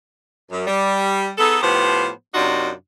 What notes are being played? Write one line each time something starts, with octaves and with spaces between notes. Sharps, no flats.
F#2
G3
B3 D#4 G#4 A4
A2 F3 B3 G4 C5
F#2 C3 D4 D#4 F4 F#4